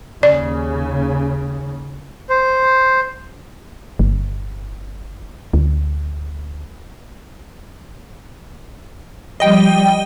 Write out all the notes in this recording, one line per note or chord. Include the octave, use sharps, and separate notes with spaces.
D#2 C#3 D5
C5
G1
D2
F3 G3 D#5 G5